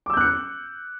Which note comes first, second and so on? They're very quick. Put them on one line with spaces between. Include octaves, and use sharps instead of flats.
D6 E6 G6 F#6 C#7